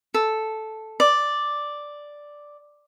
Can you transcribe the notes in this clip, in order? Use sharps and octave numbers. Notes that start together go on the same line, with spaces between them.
A4
D5